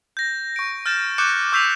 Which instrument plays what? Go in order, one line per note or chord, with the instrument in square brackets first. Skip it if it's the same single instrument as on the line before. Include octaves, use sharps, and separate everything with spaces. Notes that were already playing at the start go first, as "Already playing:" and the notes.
[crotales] G6 A#6
C#6 D7
F6 G6 A6 E7
C#6 D6 F#6 G6 C#7 E7
C#6 E6 G6 B6 C7 F7